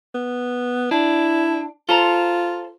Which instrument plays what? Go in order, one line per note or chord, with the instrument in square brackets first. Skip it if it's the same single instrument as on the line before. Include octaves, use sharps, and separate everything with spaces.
[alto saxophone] B3
[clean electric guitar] D4 [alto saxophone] E4
[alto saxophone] F4 [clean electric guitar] A4 C5 A#5